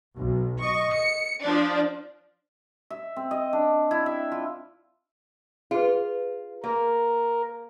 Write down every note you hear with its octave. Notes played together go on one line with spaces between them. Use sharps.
B1
D#5 C#6
C#7
F3 D4
E5
C4
D#5
D4
E4
E5
F4
F4 G#4 B4
A#3 A#4